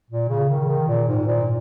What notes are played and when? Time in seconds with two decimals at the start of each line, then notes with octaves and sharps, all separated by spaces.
0.10 A#2
0.29 C#3
0.49 D#3
0.68 D#3
0.88 A#2
1.08 G#2
1.27 A#2